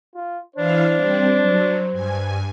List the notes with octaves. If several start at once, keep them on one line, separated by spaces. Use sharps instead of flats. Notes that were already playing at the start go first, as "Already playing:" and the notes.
F4
E3 D4 E4 C5 F5
G3 C4
F#3
G2 G#5